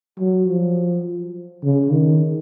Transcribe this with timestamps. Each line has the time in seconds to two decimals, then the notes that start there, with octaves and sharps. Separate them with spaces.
0.19 F#3
0.48 F3
1.64 C#3
1.91 D#3